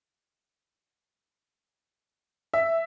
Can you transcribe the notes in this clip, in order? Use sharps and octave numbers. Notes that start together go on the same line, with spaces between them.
E5